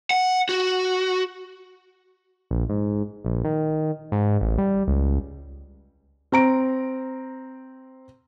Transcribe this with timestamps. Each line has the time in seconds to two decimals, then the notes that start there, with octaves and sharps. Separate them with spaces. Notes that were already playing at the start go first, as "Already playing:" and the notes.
0.11 F#5
0.49 F#4
2.51 A#1
2.69 G#2
3.25 A#1
3.44 D#3
4.12 G#2
4.41 A1
4.58 G3
4.87 C#2
6.32 C4 A#5 D7